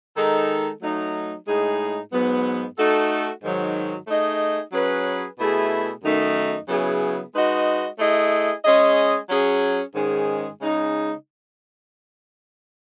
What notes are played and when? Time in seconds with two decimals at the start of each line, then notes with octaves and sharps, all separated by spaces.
0.17 D#3 G#3 D#4 A4
0.82 F#3 A3 D#4
1.47 A2 G#3 D#4 G#4
2.13 G#2 F#3 B3
2.77 A3 D#4 F#4 A4
3.43 G#2 D#3 F#3
4.07 A3 D#4 G#4 D#5
4.73 F#3 C#4 G#4 B4
5.39 B2 A3 E4 G#4
6.03 F#2 D#3 A3 D#4
6.69 C#3 F#3 B3 E4 G#4
7.34 G#3 D#4 F#4 B4 D#5
7.99 A3 E4 G#4 D#5
8.65 G#3 C#4 G#4 D#5
9.30 F#3 C#4 G#4
9.94 G#2 D#3 G#3 C#4 G#4
10.60 C#3 G#3 D#4